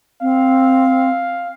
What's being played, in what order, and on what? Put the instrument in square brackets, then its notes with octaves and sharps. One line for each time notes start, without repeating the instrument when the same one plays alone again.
[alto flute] C4 [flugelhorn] F5